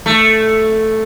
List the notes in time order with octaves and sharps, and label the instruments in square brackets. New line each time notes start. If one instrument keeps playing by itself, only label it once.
[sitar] A3